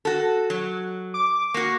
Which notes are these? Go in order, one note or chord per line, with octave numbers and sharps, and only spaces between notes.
F#4 A4
F#3
D6
A#3 F#4 C#6